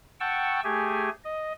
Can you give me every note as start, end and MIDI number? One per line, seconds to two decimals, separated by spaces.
0.20 0.61 78
0.20 0.61 79
0.20 0.61 81
0.20 0.61 85
0.20 0.61 88
0.64 1.09 57
0.64 1.09 67
0.64 1.09 68
0.64 1.09 80
1.24 1.53 75